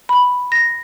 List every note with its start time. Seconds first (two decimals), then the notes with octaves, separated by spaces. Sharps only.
0.09 B5
0.52 A#6